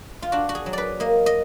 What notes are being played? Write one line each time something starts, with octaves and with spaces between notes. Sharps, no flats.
F4
D4 F#4
F#4
G#4
F#3
B4 D5
A#3 D#5
D#5